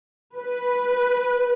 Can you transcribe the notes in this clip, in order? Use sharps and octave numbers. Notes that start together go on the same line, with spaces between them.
B4